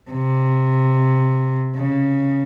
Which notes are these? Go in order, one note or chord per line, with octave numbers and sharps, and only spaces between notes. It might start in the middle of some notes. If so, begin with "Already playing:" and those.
C3
C#3